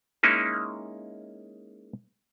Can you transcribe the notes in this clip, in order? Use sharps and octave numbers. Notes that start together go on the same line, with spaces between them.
G#3 A#3 C#4 D#4 E4